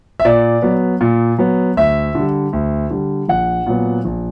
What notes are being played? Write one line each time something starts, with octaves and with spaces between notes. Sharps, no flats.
E5
A#2 D5
F#3 B3
A#2
F#3 B3
D2 E5
D3 G3
D2
D3 G3
A#1 F#5
A#2 F#3 B3
A#1